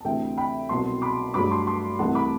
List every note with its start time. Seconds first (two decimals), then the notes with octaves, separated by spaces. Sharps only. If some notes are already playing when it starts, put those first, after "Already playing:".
0.01 A5
0.05 D2 C3 E3 E5 G5
0.37 G5 B5
0.69 C2 B2 F#3 A5 C6
1.02 B5 D6
1.34 G2 F#3 A3 B5 D6
1.50 A5 C6
1.67 A5 C6
1.99 C2 C3 E3 A3 F#5 A5
2.15 B5 D6